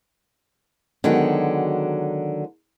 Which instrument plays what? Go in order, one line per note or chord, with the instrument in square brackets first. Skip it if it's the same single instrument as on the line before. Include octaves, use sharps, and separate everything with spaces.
[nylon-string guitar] D3 D#3 F#3 G#3 B3 F#4